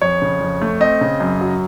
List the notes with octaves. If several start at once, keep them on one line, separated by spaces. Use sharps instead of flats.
F2 C#5
C#3
F2
A3
C4 D#5
C#3
F#2
F#3